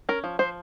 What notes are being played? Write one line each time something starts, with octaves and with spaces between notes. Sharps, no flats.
C#4 A#4
F3
F3 C5